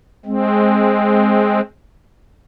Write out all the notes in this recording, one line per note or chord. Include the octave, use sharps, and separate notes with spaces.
G#3 C4